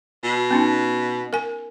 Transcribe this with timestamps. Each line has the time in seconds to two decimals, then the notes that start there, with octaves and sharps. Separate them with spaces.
0.23 B2
0.51 B3 C#4 D#4
1.33 A#4 G#5